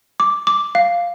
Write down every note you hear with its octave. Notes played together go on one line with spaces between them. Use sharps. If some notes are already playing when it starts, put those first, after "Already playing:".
D6
D6
F5